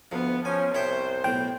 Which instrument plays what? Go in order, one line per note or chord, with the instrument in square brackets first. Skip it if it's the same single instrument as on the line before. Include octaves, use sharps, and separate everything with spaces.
[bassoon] D2 [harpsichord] F3 [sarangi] B3
[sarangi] F3 [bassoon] C#4 [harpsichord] G#5
[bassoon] C2 [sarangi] C5 [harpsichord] C#5 E5 G5
[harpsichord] B1 A2 [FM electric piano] G5